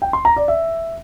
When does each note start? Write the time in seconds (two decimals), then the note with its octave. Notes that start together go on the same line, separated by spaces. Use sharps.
0.02 G5
0.13 C6
0.25 A#5
0.36 D5
0.48 E5